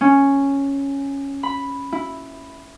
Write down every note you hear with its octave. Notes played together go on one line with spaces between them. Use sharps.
C#4
B5
E4